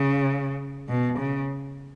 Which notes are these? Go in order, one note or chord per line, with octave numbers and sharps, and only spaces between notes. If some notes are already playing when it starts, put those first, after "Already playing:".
Already playing: C#3
B2
C#3